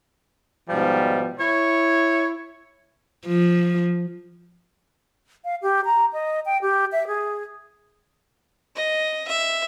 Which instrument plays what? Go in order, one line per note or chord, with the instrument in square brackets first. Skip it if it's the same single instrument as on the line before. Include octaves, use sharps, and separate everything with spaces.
[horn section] G#2 B2 F3 G3
E4 C#5
[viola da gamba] F3
[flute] F5
G4
A#5
D#5
G5
G4
E5
G#4
[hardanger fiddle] D#5
E5